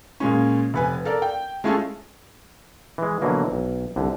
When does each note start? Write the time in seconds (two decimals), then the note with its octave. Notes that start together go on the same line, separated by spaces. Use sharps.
0.20 A#2 G#3 C#4
0.74 F1 B4 G#5
1.05 A4 A#4 D5
1.22 G5
1.64 G#3 A3 C#4 F4 G#4 A4
2.98 E3 G#3
3.22 B2 D3 E3 F#3 A#3
3.52 B1
3.96 C2 D3